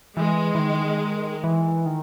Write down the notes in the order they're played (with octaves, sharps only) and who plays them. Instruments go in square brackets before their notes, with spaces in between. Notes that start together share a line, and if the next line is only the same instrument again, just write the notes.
[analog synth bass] E3 [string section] G#3
[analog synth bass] E3
D#3
E3
D#3